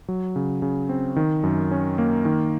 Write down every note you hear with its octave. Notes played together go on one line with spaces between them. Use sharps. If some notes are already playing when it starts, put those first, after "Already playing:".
F#3
C#3
C#3
C4
D#3
F#2
C#4
A#3
D#3